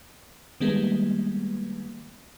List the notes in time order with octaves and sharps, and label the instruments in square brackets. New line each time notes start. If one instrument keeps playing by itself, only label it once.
[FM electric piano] D#3 G3 G#3 A#3 B3